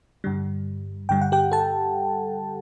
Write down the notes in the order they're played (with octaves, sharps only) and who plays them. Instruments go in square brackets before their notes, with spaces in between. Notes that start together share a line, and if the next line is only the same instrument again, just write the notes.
[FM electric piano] G2 D3 G3
G2 D3 G3 G5
F#5
G4 G5
A4 A5